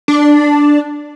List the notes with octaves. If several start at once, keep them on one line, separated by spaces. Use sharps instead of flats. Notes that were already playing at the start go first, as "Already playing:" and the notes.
D4